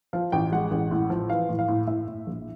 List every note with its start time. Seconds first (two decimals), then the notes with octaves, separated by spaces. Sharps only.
0.13 F3 F5
0.32 A1 G5
0.52 G#3 F#5
0.71 A1
0.91 A2
1.10 F3
1.30 E3 F5
1.49 A2
1.59 F5
1.68 A2
1.87 A2 E5
2.08 A2
2.27 A#1